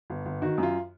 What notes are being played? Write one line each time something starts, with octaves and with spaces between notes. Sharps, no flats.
G1
G1
D#3 F#4
F#2
F4